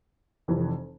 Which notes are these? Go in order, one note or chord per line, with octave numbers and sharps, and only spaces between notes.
F1 F2 C3 E3